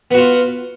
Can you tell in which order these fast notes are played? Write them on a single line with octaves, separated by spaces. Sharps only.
B3 F#4 F4